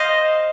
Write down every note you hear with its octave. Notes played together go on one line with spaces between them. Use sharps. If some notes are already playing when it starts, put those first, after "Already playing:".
Already playing: C5 D#5 F5